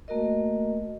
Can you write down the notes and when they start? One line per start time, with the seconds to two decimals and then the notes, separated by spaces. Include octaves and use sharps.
0.08 A3 A#3 F#4 A#4 D#5